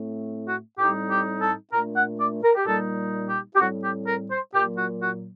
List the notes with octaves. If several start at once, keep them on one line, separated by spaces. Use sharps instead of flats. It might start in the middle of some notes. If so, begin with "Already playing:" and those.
Already playing: A2 A3 C4
F#4
A2 G3 C4 D#4 G4
G4
A4
A#2 A3 D4 A#4
F#5
D5
A#4
G4
A#2 G3 A#3 D#4 A4
G4
G4
A2 G3 C4 F#4
G4
A#4
C5
A#2 F#3 A#3 G4
F#4
F#4